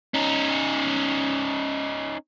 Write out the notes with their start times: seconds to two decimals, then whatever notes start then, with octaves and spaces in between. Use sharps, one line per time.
0.14 C#4 D#4